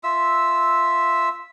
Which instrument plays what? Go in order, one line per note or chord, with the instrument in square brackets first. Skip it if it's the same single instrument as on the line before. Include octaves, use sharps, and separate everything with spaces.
[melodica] F4 E5 E6